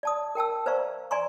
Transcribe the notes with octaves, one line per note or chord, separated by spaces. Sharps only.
D5 A5 D#6
A#4 G5 A5 E6
B4 C5 D5 F5 A#5 C#6
D5 G#5 A#5 C6 C#6